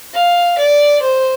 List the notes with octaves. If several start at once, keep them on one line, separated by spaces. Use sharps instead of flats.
F5
D5
C5